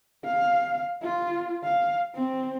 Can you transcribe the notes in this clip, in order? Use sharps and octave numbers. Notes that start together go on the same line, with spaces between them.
F5
F4
F5
C4